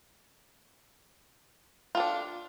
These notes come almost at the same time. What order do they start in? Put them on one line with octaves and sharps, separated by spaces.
F4 A4 D4